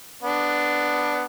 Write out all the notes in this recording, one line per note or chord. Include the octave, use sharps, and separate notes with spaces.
B3 D4